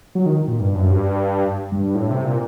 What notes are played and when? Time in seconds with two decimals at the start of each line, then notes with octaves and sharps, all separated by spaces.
0.15 F#3
0.26 D#3
0.48 A#2
0.60 G2
0.75 F#2
0.90 G2
1.72 G2
1.95 A2
2.10 C3
2.25 A#2